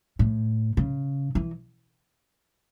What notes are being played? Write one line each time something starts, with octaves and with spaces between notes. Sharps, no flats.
A2
C#3
E3